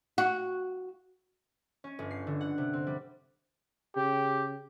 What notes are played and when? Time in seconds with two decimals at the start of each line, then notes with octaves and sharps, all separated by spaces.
0.18 F#4
1.84 C#4
1.99 G1
2.11 C7
2.27 D3
2.41 F#5
2.58 C3
2.73 C4
2.87 G3
3.96 C#3 G4